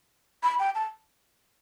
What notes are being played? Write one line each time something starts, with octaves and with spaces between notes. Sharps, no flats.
B5
G5
A5